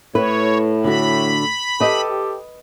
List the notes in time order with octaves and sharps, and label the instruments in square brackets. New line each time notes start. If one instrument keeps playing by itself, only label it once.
[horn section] A2 [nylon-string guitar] B4 [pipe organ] C#5
[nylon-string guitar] D3 F#4 [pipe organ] B5
[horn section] G4 A4 [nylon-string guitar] B4 D#5